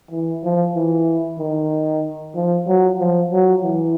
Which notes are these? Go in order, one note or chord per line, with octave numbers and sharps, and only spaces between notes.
E3
F3
E3
D#3
F3
F#3
F3
F#3
E3